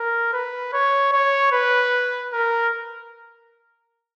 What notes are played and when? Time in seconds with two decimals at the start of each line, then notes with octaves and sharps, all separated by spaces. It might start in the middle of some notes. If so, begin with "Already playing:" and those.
Already playing: A#4
0.33 B4
0.73 C#5
1.12 C#5
1.52 B4
2.33 A#4